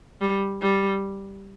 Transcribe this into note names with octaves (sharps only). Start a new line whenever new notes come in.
G3
G3